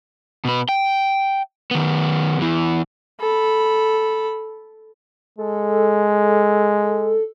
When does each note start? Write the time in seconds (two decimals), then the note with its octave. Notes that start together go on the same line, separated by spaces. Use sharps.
0.45 B2 B4
0.69 G5
1.71 D#3 B3
2.39 E2 E3
3.21 A4 B5
5.39 G#3 A4